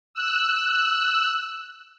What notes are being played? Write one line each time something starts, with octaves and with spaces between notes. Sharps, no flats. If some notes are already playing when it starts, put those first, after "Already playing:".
E6 F#6